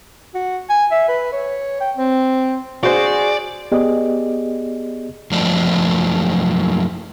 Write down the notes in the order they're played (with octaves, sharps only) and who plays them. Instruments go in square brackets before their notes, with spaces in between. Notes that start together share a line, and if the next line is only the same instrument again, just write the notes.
[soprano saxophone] F#4
G#5
E5
B4
C#5
G5
C4
[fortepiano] F#4 C5 [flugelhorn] G#4 [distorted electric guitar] D5
[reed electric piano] B3 G4 G#4 D5 D#5
[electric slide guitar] F#2 F3 F#3 A3 D5